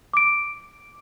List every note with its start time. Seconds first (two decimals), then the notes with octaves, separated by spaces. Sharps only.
0.13 D6 D7